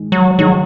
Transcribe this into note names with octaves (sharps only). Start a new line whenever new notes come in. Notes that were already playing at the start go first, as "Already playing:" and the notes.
Already playing: G#2 D#3 G#3
F#3
G#2 D#3 F#3 G#3 D#4